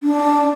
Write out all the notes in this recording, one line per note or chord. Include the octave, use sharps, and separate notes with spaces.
D4